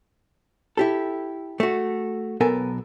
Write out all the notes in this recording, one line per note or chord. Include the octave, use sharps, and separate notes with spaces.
E4 G4 A4
A3 F#4
B1 B3 A4 A#4 G#5